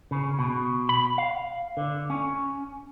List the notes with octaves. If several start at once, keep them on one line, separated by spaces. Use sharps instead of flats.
C#3
B2
B5
F5
D3
C#4